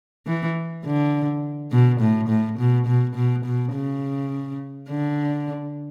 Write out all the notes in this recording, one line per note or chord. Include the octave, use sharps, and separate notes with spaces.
E3
D3
B2
A2
A2
B2
B2
B2
B2
C#3
D3